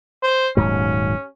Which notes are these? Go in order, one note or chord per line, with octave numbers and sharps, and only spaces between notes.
C5
D#1 G#2 F#3 C#4